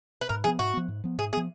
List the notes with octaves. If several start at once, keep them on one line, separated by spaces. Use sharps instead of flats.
B4
G#2 A#4
F3 B3 G#4
G#2 F#4
F3 B3
G#2
F3 B3
G#2 G#4
F3 B3 G#4